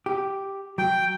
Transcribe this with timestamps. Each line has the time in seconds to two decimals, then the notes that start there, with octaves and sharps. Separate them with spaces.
0.06 G4
0.78 F#3 G5